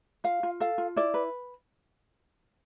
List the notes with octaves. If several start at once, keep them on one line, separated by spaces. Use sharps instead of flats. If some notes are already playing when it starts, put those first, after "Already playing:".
F4 F5
F4
A4 F5
F4
E4 D5
B4